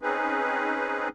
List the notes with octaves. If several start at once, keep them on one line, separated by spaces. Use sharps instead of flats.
C4 C#4 D#4 G#4 B4